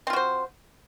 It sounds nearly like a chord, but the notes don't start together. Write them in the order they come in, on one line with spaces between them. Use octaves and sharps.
C4 F4 F#4 C5